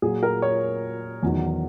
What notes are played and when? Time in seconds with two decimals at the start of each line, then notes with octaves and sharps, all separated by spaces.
0.02 A#2 F#3 G#4
0.23 A#4
0.42 C#5
1.23 E2 D#3 F#3